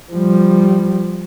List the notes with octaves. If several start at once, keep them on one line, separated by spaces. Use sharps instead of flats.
F3 G3